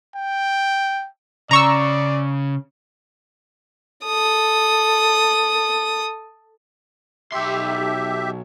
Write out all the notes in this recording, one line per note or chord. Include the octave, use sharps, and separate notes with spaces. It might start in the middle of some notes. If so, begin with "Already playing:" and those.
G5
C#3 D5 A#5 C#6 E6
A4 D#6
B1 G4 E5 C6